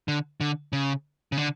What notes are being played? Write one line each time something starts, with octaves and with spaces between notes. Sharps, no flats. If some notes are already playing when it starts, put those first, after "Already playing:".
D3
D3
C#3
C#3
D3